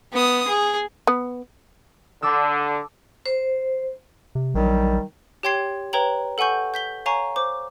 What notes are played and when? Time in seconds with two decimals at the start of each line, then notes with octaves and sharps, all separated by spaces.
0.13 B3 D#6
0.47 G#4
1.07 B3
2.23 D3 A5 D6 E6
3.26 C5
4.35 C3
4.55 A#1 D#3 F#3 G3
5.43 G4 C#5 G5 C6 G#6 C7
5.93 B4 C#5 G5 A#5 F#7
6.38 A4 F#5 G#5 C#6 G6
6.74 G6 B6 G7
7.06 C#5 F5 G#5 A#5 C#6
7.36 C5 D6